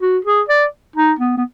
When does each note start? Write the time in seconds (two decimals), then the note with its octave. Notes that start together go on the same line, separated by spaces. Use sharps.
0.01 F#4
0.25 G#4
0.49 D5
0.96 D#4
1.19 B3
1.37 B3